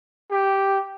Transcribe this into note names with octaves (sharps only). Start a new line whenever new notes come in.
G4